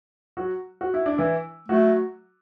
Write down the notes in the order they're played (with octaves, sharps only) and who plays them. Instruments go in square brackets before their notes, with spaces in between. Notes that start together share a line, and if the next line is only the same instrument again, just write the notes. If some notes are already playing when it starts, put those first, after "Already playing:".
[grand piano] F#3 F#4
F#4
E4
D4
E3 E4
[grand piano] F#3 F#4 [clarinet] A3